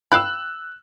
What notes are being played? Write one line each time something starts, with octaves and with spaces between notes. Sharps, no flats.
F5 G5 B5 E6 F#6